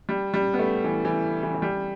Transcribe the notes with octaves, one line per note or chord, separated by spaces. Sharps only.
G3
G3
B3
A3
E3
E3
E3
E3
G3